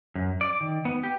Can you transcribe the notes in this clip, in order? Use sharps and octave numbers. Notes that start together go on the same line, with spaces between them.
F#2
D5
D#3
B3
G4